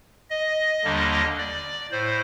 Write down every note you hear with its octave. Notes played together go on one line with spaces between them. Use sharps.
D#5
D#2 D3 G3 A#3 D4
D5
A2 C5